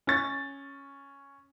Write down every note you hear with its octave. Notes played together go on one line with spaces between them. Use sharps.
C#4 A6